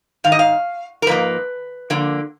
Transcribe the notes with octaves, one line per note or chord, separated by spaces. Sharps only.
G#2 D#3 F5
D#5
F5
A#4
G#2 F3 A#3 B4
D3 F3 A#3